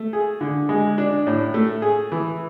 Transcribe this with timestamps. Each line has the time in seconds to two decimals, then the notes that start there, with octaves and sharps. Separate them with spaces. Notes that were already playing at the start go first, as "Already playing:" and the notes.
Already playing: A3
0.13 G#4
0.41 D3
0.69 G#3
0.98 D4
1.27 A2
1.54 A3
1.82 G#4
2.12 E3